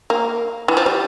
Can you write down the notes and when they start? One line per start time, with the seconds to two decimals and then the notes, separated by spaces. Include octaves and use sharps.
0.10 A#3
0.68 E3
0.77 F3
0.86 G3